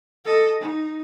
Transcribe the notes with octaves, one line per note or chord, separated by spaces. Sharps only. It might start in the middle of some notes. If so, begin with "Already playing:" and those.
A4 D#5
D#4